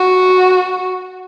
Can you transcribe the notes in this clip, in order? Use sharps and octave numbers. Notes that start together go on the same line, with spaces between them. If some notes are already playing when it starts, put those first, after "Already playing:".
Already playing: F#4